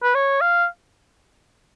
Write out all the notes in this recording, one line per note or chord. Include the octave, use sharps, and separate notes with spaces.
B4
C#5
F5